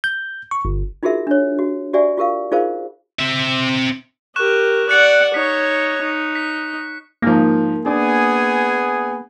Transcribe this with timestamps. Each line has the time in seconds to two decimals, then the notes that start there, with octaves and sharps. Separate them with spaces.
0.04 G6
0.51 C#6
0.65 G1
1.03 D#4 F4 F#4 G#4 A#4 E5
1.27 D4 C#5
1.59 F#4
1.93 F#4 G4 D5 E5 G#5
2.17 F4 G4 A#4 F5
2.52 D#4 F4 G#4 A#4 C5 F5
3.19 C4 E5
4.36 G4 A#4 C#6 F#6 E7
4.89 D5 F#5 F#6 C#7
5.34 D#4 C#5 B6
6.01 D#4
6.35 B6
7.22 G#2 D#3 F3 A#3
7.86 B3 D4 G#4 G#5